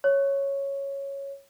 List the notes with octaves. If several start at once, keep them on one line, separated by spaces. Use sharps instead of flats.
C#5